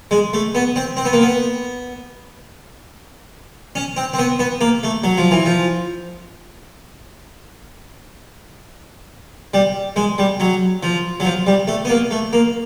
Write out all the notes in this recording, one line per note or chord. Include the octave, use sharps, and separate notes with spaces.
G#3
A3
B3
C4
C4
B3
A#3
B3
C#4
C4
C4
B3
B3
A#3
A3
F#3
F3
E3
F3
G3
G#3
G3
F#3
F3
F#3
F3
G3
A3
B3
A#3
A3
A#3